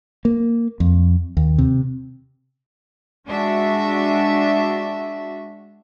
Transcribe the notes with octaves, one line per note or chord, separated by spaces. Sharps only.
A#3
F2
D#2
C3
G#3 D4 F#4 E5